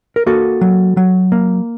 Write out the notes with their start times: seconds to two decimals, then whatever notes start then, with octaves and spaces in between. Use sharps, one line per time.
0.16 A#4
0.26 A#3 F#4 A4
0.61 F#3
0.97 F#3
1.32 A#3